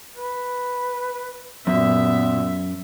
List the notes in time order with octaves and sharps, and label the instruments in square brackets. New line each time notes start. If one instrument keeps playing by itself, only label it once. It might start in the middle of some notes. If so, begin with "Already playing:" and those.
[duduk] B4
[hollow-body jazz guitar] F#2 [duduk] A#2 [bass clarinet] B3 [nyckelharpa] E5